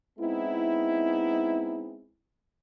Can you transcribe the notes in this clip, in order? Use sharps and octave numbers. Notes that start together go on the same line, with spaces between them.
G#3 B3 C4 D#4 E4